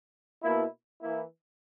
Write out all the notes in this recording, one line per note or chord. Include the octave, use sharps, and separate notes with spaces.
B2 A#3 E4
E3 A#3 E4